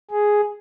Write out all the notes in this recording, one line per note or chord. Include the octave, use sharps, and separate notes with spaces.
G#4